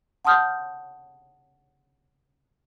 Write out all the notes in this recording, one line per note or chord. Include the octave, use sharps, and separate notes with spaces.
F#5 A5 C6 D#6 F6 G6